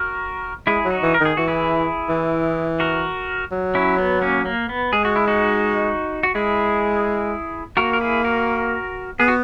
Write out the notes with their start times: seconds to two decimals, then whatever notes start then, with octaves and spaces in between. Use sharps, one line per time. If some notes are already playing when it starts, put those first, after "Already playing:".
Already playing: F#4 A#4
0.67 G#3 E4 G#4
0.85 F#3
0.90 D#4 F#4
1.03 E3
1.14 A#4
1.21 D#3 G#4
1.37 E3 F#4
1.48 E4 G#4
2.09 E3
2.80 F#4 A#4
3.52 F#3
3.75 C#4 E4
3.99 B3
4.22 A#3 C#4
4.46 A#3
4.69 B3
4.93 G#3 G#4
5.05 F#4
5.16 E4
5.28 D#4 F#4
6.23 F#4
6.35 G#3 E4 G#4
7.77 A#3 F#4 A#4
7.93 A#4
8.01 E4 G#4
8.24 F#4 A#4
9.20 B3 G#4
9.28 F#4